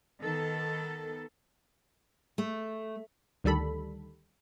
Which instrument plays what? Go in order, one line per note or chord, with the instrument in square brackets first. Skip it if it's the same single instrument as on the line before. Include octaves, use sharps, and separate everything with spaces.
[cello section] D#3 B3 A4
[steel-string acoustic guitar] A3
[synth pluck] D2 D#3 G3 A4 B5